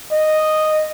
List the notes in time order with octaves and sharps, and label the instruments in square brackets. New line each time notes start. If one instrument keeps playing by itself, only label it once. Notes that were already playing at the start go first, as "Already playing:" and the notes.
[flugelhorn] D#5